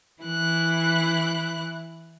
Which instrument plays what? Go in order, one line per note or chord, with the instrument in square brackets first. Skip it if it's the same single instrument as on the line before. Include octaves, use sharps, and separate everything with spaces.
[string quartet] E3 E4 F#6